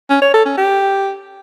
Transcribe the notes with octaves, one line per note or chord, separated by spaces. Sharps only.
C#4
C#5
A4
C#4
G4